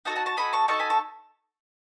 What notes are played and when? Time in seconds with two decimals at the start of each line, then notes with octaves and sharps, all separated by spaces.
0.05 D#4 F#4 A4 F#5 A5
0.16 F#5 A5
0.26 A5 C#6
0.37 D#4 F#4 A4 G#5 B5
0.53 A5 C#6
0.68 D#4 F#4 A4 A5 C#6
0.79 G#5 B5
0.90 A5 C#6